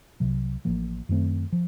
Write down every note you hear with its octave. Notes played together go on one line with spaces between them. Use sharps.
C2 C3 F#3
A1 A2 F3 A#3
F#2 D#3 A3 C4
F3